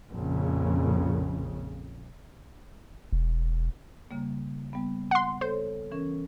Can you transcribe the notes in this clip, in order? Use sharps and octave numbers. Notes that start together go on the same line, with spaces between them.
A#1 F2 C#3
E1
C#3 G3 A#3
G3 B3
F#5 C6
A4 C5 C#5
E3 C#4 A#4